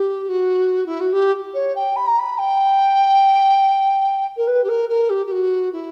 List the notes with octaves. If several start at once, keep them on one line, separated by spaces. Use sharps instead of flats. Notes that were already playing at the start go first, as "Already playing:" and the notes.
Already playing: G4
F#4
E4
F#4
G4
C#5
G5
B5
A#5
B5
G5
A#4
B4
G4
A#4
A#4
G4
G4
F#4
E4